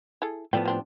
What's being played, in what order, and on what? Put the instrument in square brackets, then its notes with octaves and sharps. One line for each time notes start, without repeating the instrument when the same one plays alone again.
[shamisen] E4 G#4 A4
[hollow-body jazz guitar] A2 F3 B3 [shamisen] A3 D5 G5
[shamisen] G3 C4 D4